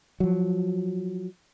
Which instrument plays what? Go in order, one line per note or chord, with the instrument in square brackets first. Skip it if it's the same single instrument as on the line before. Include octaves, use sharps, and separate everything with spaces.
[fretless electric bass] F3 F#3